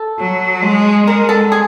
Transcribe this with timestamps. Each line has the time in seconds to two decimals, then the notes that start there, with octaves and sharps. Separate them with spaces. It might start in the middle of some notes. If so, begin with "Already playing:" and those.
Already playing: A4
0.19 F#3
0.63 G#3
1.07 G#3 A#4
1.29 A4
1.52 G#4